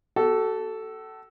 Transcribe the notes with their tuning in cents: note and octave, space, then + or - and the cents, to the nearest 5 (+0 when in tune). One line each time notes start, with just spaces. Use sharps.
F#4 +45 A4 +0